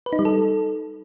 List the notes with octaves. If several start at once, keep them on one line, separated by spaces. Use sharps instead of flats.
B4
D#4
G3
A4